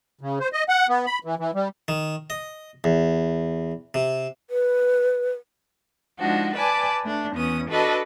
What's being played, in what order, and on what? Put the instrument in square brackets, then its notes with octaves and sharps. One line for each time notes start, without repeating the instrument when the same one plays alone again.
[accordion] C#3
C5
D#5
F#5
B3
B5
E3
E3
G3
[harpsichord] D#3
D#5
E2
C3
[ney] B4
[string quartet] F3 G#3 D4 D#4 F#4
B4 D5 G#5 A5 D6
A3 D4
E2 B3 C#4 D#6
D4 F#4 A4 B4 D#5